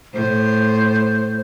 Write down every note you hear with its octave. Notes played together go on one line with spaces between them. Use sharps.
A2 C5